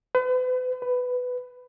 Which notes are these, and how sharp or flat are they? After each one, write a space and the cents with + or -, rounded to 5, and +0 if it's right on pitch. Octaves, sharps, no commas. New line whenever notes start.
B4 +40
B4 +10